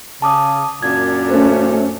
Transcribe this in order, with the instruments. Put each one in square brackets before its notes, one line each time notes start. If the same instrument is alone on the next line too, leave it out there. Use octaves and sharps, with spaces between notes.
[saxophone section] C#3 [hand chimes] A5 D6 D#6
[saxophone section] F#2 A#2 D4 [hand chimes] G#6
[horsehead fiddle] A3 C#4 [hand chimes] C5